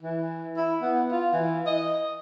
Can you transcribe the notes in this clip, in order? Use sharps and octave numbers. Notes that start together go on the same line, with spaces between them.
E3
E4
B3
F4
E3
D#5